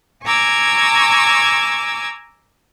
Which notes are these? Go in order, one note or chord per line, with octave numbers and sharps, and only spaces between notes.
G#5 A#5 C#6 D6 E6 G#6